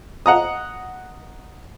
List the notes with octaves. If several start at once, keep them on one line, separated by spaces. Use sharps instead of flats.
D#5 F#5 A#5 D#6